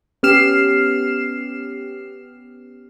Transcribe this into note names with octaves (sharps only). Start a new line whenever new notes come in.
B3 C#4 G4 F6 C7 E7